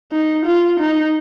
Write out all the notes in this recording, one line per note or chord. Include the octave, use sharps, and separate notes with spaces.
D#4
F4
D#4